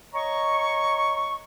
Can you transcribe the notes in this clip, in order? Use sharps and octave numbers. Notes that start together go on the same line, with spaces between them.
C#5 D#5 A#5 C#6